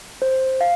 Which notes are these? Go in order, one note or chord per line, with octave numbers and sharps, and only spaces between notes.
C5
F5